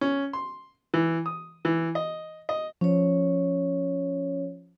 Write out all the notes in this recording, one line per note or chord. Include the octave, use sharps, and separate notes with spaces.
C#4
C6
E3
D#6
E3
D#5
D#5
F3 C#4 C#5